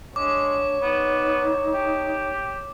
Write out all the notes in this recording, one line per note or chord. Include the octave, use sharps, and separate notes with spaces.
G#3 D4 C#5 D6
B3 D#4
G4